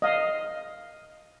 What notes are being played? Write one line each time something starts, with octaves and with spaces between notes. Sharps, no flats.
D#5 F5